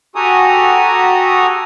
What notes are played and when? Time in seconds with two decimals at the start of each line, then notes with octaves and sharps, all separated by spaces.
0.16 F#4 G4 A4 G#5 A#5 D#6